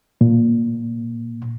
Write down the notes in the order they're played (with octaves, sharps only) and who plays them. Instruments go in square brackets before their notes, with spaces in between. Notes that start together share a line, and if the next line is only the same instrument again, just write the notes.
[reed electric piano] A#2